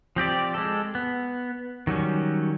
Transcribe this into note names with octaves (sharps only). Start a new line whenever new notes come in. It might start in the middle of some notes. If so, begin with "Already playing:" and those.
F3 C4 G4 D5
G#3 A4
B3
D#3 F#3 G3 C#4